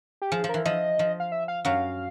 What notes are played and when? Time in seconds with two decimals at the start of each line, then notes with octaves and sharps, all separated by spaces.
0.22 G4
0.32 F3 G#4
0.44 F3
0.49 E3 A#4
0.65 F3 D#5
0.99 F3
1.20 F5
1.32 E5
1.48 F5
1.65 F#2 F#3 F5